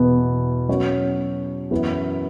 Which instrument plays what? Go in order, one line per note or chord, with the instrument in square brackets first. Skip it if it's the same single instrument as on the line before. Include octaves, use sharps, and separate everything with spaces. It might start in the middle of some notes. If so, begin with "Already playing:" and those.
Already playing: [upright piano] E2 B2 B3 E4
F#3 C#4 F#4 C#5
F#2 E3 B3